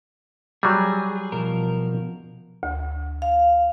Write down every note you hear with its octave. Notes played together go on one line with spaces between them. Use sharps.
F#3 G3 G#4
B2 F3 A#4
D2
F5